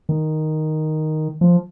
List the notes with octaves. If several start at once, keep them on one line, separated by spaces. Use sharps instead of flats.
D#3
F3